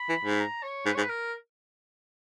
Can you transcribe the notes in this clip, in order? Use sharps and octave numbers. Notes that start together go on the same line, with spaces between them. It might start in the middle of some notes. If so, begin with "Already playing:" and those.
Already playing: B5
E3
G#2
A#5
C#5
G#2 B4
C#5
G#2
B4
A#4